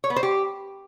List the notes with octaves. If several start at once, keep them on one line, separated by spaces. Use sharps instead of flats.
C#5
B3
C5
G4